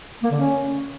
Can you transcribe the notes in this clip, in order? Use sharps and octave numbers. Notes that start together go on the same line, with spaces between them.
A#3
D3
C#4